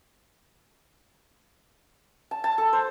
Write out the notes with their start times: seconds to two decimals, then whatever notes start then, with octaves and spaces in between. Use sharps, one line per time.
2.31 A5
2.44 A5
2.58 A4
2.73 C5